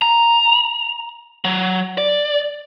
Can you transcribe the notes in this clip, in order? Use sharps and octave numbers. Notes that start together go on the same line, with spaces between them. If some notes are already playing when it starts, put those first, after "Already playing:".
A#5
F#3
D5